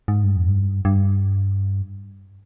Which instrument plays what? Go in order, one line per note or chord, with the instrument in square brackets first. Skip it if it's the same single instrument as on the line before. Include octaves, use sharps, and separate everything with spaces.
[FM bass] G#2
G2
F2
G2
G2